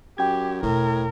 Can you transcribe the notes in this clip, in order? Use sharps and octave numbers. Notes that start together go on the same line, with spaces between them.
F#2 G4 G5 G#6
E1 A2 A#4